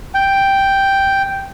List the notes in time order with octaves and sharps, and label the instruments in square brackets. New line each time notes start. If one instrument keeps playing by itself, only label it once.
[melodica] G5